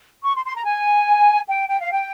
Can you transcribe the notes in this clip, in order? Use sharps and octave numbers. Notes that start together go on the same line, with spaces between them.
C#6
C6
C6
A#5
G#5
G5
G5
F5
G5